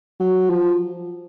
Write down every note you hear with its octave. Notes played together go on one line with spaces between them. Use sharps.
F#3
F3